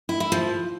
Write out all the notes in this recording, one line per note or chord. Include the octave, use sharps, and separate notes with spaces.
E4
E4
F3